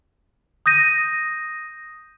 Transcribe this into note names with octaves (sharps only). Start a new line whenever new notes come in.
D#6 G6 A#6 D#7